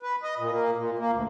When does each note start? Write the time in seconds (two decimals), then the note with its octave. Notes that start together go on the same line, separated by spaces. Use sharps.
0.03 B4
0.23 D#5
0.39 A#2
0.52 A#3
0.77 A#2
0.99 A#3
1.13 D2